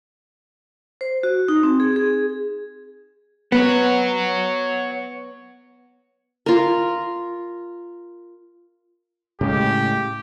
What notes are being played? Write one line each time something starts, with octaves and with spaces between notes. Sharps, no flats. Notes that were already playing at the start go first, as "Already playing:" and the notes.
C5
F#4
D#4
C4
G#4
G#4
B3 C#5 F#5
F4 A#4
A2 C#3 G#3 G4